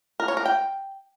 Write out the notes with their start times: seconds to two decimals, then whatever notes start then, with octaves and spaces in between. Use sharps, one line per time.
0.20 A#4
0.28 C#5
0.37 A#4
0.46 G5